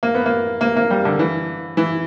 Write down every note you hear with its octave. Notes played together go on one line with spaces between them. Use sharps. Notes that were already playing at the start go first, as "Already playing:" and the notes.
A#3
B3
A#3
A#3
A#3
G3
D3
E3
E3